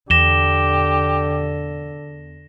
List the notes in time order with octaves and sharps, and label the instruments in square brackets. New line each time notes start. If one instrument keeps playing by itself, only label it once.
[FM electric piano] E2 [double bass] D3 [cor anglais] G4 [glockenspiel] A#6 E7 G7